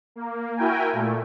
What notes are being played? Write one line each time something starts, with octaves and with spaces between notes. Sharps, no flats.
A#3
E4 F#4 A#4 G5 G#5
A#2 A3